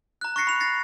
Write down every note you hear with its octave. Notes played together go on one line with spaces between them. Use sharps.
A#5 F#6
C#6 F#6 A6 A#6 C7 C#7
B5 F7
A6 A#6 C7 C#7